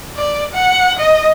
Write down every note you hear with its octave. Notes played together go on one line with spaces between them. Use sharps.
D5
F#5
D#5